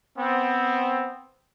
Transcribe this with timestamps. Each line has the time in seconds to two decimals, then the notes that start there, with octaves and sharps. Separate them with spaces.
0.17 B3 C4